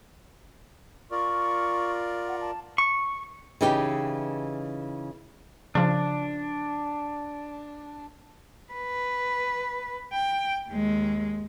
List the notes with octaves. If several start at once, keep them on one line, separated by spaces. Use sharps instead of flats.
F4 A#4 D5 C#6
F#5
A5
C#6
C#3 E3 D#4 G4
C#3 F3 D4
B4
G5
D#2 G#3